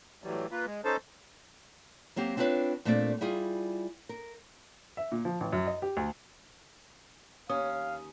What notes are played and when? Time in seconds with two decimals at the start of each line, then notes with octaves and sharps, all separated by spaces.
0.24 A2 E3 F#3 G3
0.51 A#3 F4 B4
0.66 G#3
0.85 C#4 D#4 A4 C5 A5
2.16 F#3 A#3 C4 G4
2.37 C4 D4 F4 A#4 B4 C#5
2.85 A#2 A3 A#3 C4 D4 D5
3.21 G3 E4 F4 G#4
4.09 A#4
4.97 E5
5.12 A#2
5.25 F3
5.40 A1
5.53 F#2
5.67 D#5
5.82 G4
5.97 D2
7.50 D#2 C#4 F5 D#6